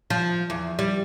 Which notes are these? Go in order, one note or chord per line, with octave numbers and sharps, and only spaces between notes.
F3
E2
G3